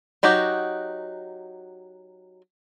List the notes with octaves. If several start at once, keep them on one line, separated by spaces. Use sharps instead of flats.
F#3 D#4 F#4 G4